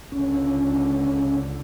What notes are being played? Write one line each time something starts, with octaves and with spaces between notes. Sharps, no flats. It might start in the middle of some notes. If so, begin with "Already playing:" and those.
C#2 D3 C#4